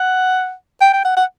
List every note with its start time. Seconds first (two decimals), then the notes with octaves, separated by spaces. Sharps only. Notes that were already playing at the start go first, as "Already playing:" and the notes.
Already playing: F#5
0.81 G5
0.93 G5
1.05 F#5
1.17 F#5